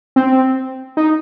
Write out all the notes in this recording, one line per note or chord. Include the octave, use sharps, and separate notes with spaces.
C4
D#4